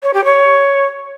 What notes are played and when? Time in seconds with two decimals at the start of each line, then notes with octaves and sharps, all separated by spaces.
0.03 C#5
0.14 G4
0.25 C#5